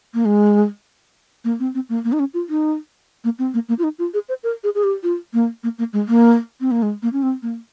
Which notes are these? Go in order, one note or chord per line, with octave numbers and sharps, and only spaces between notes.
A#3
G#3
A#3
C4
C4
A#3
A#3
D#4
C#4
F4
D#4
A#3
C4
A#3
A#3
F4
D#4
F4
G#4
C5
A#4
G#4
G#4
G4
F4
A#3
A#3
A#3
G#3
A#3
C4
A#3
G#3
A#3
C#4
C4
A#3